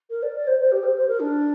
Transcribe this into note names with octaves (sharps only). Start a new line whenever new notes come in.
A#4
D5
D5
C5
C5
G4
C5
C5
A#4
D4